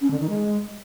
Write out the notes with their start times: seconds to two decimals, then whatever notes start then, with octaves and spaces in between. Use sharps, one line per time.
0.01 C#4
0.11 D3
0.20 D#3
0.30 G#3